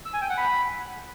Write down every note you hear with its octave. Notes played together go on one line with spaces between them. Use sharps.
E6
G#5
G5
F#5
B5